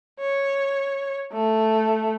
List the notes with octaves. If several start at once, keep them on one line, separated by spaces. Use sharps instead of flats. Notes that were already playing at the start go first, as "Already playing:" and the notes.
C#5
A3